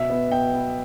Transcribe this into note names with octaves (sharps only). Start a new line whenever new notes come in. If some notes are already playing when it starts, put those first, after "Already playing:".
Already playing: B2 E5
B3
B2 G5
B3